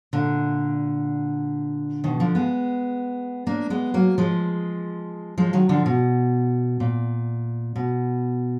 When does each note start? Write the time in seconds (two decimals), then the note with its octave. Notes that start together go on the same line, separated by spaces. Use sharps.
0.13 A#2 D3
2.04 B2 D#3
2.20 D3 F3
2.35 G#3 B3
3.47 A#3 D4
3.70 G#3 B3
3.94 F#3 A#3
4.18 F3 G#3
5.38 F3 G#3
5.53 D#3 F#3
5.69 D3 F3
5.86 B2
6.80 A#2
7.76 B2